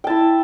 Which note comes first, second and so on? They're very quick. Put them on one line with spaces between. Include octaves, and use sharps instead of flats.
G5 A5 E4